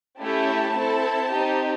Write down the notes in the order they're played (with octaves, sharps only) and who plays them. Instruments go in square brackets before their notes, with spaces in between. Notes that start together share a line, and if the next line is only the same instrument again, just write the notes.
[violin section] A3 C#4 E4 G4 A5
C4 E4 A4
C4 D#4 G4